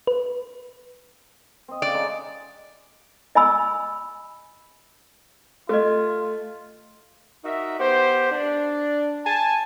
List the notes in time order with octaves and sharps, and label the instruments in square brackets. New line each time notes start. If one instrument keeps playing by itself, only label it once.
[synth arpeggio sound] B4
[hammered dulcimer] C4 D#5
[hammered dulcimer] C#3 [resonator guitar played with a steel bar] D5
[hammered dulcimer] G#3 D#4
[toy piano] D#5 G#5 B5 E6
[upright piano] A3 [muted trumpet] F4 [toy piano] A4 D#5
[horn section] D#4 F#4 A#4 E5
B3 G4 C5
D4
G#5 A5